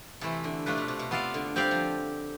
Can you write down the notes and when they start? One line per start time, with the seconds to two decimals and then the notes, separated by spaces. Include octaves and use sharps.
0.21 C3 E3 A3 E4 A4
0.44 D3
0.66 C3 A3 D4 F4 B4
0.78 B2
0.88 C3
0.99 B2
1.11 C3 B3 F4 A4 D5 F5
1.34 D3
1.56 G3 C4 G4 D5 F5
1.71 F3